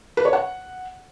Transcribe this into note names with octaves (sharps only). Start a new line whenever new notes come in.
B4
C#5
F#5